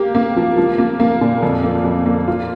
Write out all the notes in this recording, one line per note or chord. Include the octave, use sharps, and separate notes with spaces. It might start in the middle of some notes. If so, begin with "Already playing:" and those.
Already playing: A#3 G4
A#3
F3
F3
A#3
A#3
A#2
F2
A#3
F2
A#3
F4